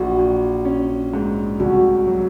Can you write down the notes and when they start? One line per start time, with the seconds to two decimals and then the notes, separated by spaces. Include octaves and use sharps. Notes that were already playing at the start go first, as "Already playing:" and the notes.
Already playing: A#1 F#4
0.19 A#1
0.65 C#4
1.13 G#2
1.60 C2 F#4
2.07 F#3